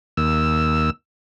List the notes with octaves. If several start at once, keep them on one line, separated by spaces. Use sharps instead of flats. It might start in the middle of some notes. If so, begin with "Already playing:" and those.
D#2 E6